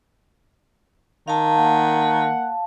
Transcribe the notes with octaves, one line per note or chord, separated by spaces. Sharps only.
D#3 F5 A5
A#3 F#5